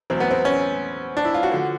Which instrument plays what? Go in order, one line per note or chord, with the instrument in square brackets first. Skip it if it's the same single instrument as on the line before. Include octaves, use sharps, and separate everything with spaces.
[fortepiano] E2 B2 F#3 C4
B3
C4
C#4
D4
E4
F4
F#4
D3 F3